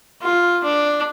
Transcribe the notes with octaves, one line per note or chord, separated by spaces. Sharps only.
F4
D4